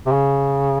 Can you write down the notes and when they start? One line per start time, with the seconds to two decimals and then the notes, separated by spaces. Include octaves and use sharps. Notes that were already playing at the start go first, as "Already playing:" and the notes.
0.06 C3
0.12 C#3